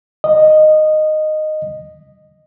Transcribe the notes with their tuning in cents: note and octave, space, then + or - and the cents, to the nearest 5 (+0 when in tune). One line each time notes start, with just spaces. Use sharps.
D#5 -10